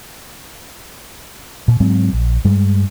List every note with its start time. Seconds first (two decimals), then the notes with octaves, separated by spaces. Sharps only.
1.68 A#2
1.80 G#2 F#3 G#3 C4
2.13 A#1
2.45 G2 G3 G#3